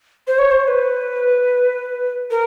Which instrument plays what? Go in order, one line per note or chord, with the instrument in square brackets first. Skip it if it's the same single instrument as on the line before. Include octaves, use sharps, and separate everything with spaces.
[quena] C5
C#5
C5
B4
A#4